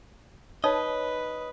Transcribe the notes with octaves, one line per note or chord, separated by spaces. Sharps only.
D#4 B4 C#5 D#5 A5